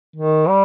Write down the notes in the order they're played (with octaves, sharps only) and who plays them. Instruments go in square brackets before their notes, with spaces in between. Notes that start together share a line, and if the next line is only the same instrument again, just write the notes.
[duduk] D#3
G3